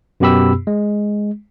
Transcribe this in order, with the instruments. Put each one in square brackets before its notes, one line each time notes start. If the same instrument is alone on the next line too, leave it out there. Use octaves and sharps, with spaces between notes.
[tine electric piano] F#2 B2 B3 G4 B5 E6
G#3